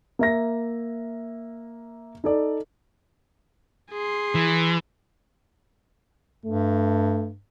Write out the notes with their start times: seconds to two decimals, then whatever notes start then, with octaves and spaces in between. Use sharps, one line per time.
0.19 A#3 E5 A#6
2.24 D#4 A4 D5
3.91 G#4 C6
4.35 E3
6.45 G2 A3